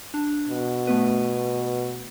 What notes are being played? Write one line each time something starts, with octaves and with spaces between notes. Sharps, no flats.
D4
B2
A3 B3 B4